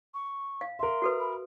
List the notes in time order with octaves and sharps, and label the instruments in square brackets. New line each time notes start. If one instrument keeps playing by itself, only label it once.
[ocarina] C#6
[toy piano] F5
[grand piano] A#4 E5 [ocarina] C6
[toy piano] F#4 A4 B4
[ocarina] B5